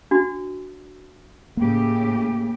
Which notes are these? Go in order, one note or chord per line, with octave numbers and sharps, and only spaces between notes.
D4 F#4
A2 C#3 A#3 G4